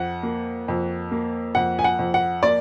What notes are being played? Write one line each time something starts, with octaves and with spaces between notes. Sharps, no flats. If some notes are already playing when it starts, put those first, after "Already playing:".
Already playing: F2 F#5
A#3
F2
A#3
F2 F#5
G#5
F#5
F2
F#5
A#3 D5